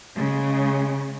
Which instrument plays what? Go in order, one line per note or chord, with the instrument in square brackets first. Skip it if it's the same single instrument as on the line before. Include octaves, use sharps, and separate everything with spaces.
[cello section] C#3 G#3